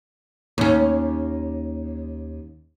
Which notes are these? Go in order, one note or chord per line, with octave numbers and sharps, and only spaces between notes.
D#2 C#4